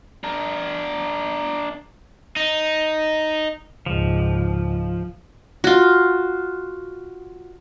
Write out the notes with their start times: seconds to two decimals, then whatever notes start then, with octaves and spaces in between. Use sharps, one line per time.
0.24 D4 A#4
2.36 D#4
3.86 C#2 G#2 F3
5.64 F4 F#4